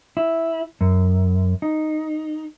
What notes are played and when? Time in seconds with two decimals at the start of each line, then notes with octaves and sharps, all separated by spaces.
0.17 E4
0.81 F#2
1.62 D#4